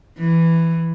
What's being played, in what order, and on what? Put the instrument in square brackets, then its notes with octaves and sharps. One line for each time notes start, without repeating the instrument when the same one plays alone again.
[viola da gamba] E3